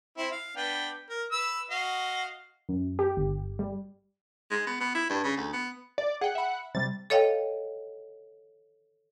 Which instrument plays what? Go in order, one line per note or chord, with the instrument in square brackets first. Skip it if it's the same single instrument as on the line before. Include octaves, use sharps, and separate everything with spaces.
[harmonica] C4 E4
F5
B3 D4 G5
A#4
B4 E6
F#4 D#5 F5
[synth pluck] F#2
G4
G1
G3
[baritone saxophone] G#3
B3
B3
E4
G2
C#3
D2
B3
[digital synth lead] D5
[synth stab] G#4 G5 [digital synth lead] F#5
[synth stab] E5 B5
[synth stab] C3 G3 [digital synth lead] A6
[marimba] A4 C#5 D#5 F5 G5